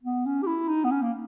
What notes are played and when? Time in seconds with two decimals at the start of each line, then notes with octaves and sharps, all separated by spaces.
0.03 B3
0.26 C#4
0.43 G4
0.47 E4
0.69 D#4
0.84 B3
0.91 C#4
1.02 A#3